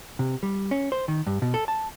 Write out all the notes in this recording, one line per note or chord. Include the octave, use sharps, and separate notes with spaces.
C3
G3
C#4
C5
D#3
G2
B2
A4
A5